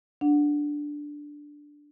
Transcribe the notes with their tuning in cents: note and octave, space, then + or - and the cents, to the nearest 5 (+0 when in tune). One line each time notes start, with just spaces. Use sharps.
D4 +0 F#5 -15